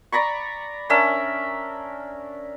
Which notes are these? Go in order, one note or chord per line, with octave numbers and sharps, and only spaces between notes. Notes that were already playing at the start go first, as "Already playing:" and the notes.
D5 A#5 B5 C#6
C#4 D4 A#4 E5